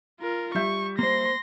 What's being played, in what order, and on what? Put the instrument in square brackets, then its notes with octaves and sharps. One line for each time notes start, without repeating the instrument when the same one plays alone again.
[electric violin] F4 A#4
[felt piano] G3 E5 G6 [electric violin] C#6
[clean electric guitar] A#3 C5 [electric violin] C6 A#6